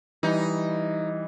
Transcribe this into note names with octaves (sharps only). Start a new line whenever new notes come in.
E3 G3 D#4